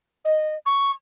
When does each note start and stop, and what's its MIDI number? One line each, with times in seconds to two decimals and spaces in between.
0.24 0.54 75
0.65 0.90 85